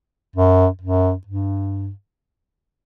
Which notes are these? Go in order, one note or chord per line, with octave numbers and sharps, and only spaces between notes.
F#2
F#2
G2